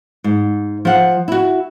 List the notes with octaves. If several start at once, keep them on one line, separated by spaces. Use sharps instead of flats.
G#2
F3 F#5
E4 F#4